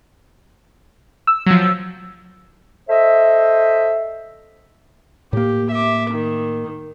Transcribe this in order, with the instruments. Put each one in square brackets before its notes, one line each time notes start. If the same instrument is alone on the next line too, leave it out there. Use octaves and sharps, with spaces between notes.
[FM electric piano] E6
[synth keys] F3 F#3
[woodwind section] A4 C5 D#5 E5
[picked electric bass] A2 A#3 [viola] G4
[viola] E5 D6
D#3